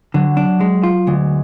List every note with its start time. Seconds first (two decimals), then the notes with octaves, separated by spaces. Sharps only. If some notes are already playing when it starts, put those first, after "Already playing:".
0.14 D3 F#3
0.37 D4
0.61 G#3
0.83 F4
1.07 D2 G#3